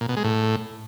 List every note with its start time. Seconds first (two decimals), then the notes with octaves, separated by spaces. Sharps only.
0.01 A#2
0.09 B2
0.16 G#3
0.24 A2